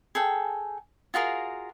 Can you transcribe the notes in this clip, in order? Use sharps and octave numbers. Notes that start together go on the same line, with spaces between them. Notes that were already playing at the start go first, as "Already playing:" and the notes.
G#4 A4 G5
F4 F#4 G#4 A#4